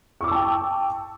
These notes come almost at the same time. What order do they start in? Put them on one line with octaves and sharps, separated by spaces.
C#6 D6 E6 A5 G5